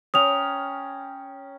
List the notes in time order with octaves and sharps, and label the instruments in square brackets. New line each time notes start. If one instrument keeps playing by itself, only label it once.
[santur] C#4 G5 A#5 [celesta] D#6 F7